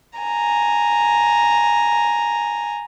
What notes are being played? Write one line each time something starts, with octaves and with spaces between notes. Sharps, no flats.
G#5 A#5